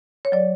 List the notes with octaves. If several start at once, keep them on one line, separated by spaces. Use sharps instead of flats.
C#5
F#3 D5